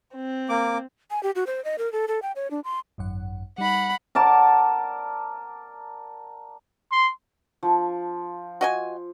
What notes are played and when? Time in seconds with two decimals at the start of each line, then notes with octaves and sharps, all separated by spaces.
0.16 C4
0.49 A#3 D6
1.11 G#5
1.23 G4
1.35 F#4
1.47 C5
1.64 D#5
1.78 A#4
1.92 A4
2.08 A4
2.22 G5
2.36 C#5
2.51 D4
2.64 C6
2.98 G#1 F#2 F#5
3.58 G3 D#4 F#5 B5
4.15 A#4 D5 F#5 A5
6.92 C6
7.63 F3
8.61 F#4 D#5 G#5